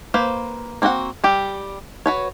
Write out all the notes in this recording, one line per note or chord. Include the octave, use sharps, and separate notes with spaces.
A#3 B4 C5
A#3 C4 F#4 A#4 F#5
G3 G4
F#4 B4 C#5